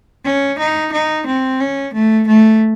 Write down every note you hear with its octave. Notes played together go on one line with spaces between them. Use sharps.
C#4
D#4
D#4
C4
C#4
A3
A3